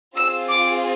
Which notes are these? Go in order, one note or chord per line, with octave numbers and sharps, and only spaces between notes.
C4 F4 G#4 E6
D6